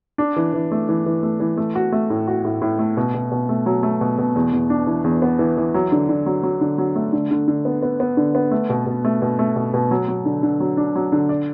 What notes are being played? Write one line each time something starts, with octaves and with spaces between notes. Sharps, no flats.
D4
E3
E3
A3
E3
E3
A3
E3
A3
F#4
A3
A2
F#4
A2
A2
A3
B2
B2
B2
A3
F#3
A3
B2
B2
E2
E2
D4
E3
E2
B3
E3
E3
F#3
D3
D3
F#3
F#3
D3
F#3
A3
D3
D3
D3
B3
B3
B3
D3
B3
A3
B2
B2
A3
B2
A3
B2
B2
F#3
F#3
D3
D3
F#3
D4
F#3
D3
D5